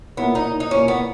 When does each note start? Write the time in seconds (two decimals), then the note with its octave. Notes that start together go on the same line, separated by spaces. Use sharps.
0.17 A#2 A#3 B3 E4 A#4 C#5
0.35 D#4
0.60 D#4
0.71 A#2 A#3 C#4 E4 A#4 C#5
0.88 B3